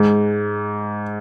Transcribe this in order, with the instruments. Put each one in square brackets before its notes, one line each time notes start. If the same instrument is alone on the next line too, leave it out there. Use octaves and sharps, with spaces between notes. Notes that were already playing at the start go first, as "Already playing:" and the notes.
Already playing: [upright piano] G#2